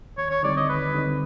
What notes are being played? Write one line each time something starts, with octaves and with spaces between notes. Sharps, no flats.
D#2 C#5
C#5
D3 G3 C4 D#4 D5
D#5
D#2 B4
D3 G3 C4 D#4